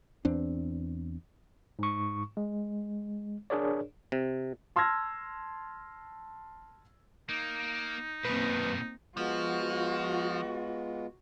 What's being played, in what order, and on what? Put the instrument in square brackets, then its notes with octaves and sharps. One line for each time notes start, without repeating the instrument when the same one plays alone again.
[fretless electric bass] E2 C4 D4
[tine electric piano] G#2 C#6
G#3
D4 G#4 A#4 C#5 D5
[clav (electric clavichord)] C3
[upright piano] A5 C6 E6 F6 G#6 A#6
[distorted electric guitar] A#3 [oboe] D#4
[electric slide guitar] F#2 B4 [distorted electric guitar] B2 D#3 [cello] A#3 C4
[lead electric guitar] F3 [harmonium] G#3 B3 F4 [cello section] F#4